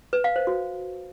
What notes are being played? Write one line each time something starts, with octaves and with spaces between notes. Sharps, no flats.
B4
F5
C5
F#4